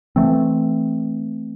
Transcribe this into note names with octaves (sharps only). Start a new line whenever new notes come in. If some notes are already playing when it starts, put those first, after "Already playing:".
E3 A3 C4